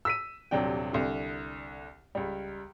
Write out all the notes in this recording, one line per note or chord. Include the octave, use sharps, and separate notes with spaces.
E6 B6 D#7
D#1 C3 F#3 D4 G5
C2 D3
C#2 G3